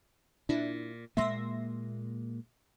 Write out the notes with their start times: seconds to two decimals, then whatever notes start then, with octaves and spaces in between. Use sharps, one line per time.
0.49 A#2 D4 E4
1.17 A#2 G#3 A#3 E5 C6 A#6